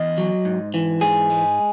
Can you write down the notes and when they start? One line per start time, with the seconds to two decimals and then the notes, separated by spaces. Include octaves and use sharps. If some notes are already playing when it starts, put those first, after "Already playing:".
Already playing: E2 D#5
0.18 F#3
0.45 G#2
0.74 E3
1.01 G#2 G#4
1.30 G#3